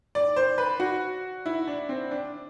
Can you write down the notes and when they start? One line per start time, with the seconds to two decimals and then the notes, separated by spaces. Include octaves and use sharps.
0.15 D5
0.36 C5
0.58 B4
0.80 F#4
1.46 E4
1.67 D4
1.89 C4
2.11 D4